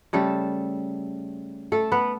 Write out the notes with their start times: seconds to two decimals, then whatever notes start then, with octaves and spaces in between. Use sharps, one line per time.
0.13 C#3 G3 A3 A4
1.72 A3 A4
1.92 B3 B4